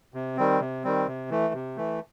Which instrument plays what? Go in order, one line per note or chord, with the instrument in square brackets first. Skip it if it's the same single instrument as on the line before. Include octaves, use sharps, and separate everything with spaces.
[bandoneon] C3
D#3 G3 C4
C3
D#3 G3 C4
C3
E3 A3
C3
E3 A3